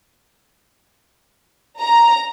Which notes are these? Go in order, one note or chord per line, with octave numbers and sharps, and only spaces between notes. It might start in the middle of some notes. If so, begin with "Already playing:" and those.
A#5